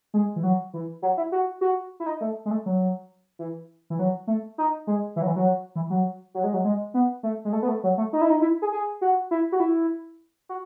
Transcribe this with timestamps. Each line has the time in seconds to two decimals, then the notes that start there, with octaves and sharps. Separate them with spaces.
0.14 G#3
0.36 E3
0.43 F#3
0.74 E3
1.02 F#3
1.17 E4
1.32 F#4
1.61 F#4
2.00 E4
2.06 D#4
2.21 A3
2.46 G#3
2.51 A3
2.66 F#3
3.39 E3
3.90 E3
3.99 F#3
4.27 A3
4.58 D#4
4.87 G#3
5.16 E3
5.22 F#3
5.27 E3
5.36 F#3
5.76 E3
5.90 F#3
6.34 F#3
6.44 G#3
6.54 F#3
6.65 G#3
6.94 B3
7.23 A3
7.45 G#3
7.53 A3
7.62 B3
7.68 A3
7.83 F#3
7.98 A3
8.13 D#4
8.21 E4
8.30 D#4
8.42 E4
8.62 G#4
8.72 G#4
9.01 F#4
9.31 E4
9.52 F#4
9.60 E4
10.49 F#4